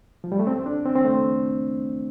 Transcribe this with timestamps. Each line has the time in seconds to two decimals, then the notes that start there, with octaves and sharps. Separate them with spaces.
0.24 F3
0.32 G3
0.39 A3
0.47 C4
0.66 D4
0.85 C4
0.96 C4
1.05 A3